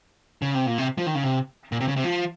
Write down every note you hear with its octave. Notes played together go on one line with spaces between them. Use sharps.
C#3
C3
A#2
C3
F3
D#3
C#3
C3
A#2
C3
C#3
C3
F3